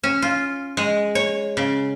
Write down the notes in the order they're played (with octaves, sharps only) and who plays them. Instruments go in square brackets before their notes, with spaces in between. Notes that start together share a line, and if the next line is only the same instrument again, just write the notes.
[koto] C#4
F4
G#3
C#5
C#3